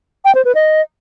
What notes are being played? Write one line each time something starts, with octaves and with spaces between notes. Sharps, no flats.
G5
C5
B4
D#5